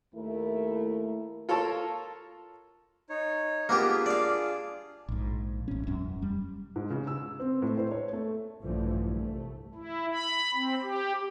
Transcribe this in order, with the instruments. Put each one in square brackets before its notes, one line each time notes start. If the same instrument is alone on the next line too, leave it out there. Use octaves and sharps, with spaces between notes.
[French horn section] D#2 A3 E4 A#4
[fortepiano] F4 A4 A#4 C#5 A5
[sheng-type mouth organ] D#4 C#5
[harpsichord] A#3 B3 G4 [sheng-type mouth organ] D4 F4 G#4
[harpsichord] D5 F5
[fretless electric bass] A#1 G#2
A1 C#4
E1 F#2 C#4
G3
[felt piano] G#2
C#3
E6
C4
A2
C5
C#5
A3
[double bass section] A#1 G2 D3 E3 F3 A3
C2 A3
[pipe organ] E4
B5
C4
G4